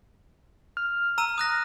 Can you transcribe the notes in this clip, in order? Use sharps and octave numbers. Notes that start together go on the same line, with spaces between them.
F6
A#5 E6 D#7
D#6 F#6 A#6